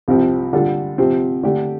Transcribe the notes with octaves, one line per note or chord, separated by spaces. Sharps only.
C2 C3 F3 C4 G4
D3 G3 F4 A4
C3 F3 C4 G4
D3 A3 D4 G4